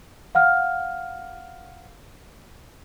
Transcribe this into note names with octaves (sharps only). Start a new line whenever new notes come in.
F5 F#5 F6